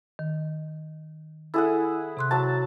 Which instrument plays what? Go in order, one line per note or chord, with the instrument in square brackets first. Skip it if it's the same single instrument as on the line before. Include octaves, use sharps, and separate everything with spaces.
[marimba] D#3
[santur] E4 G#4 F#5 [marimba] A4
[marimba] C3 C6 F#6
[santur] F#3 A5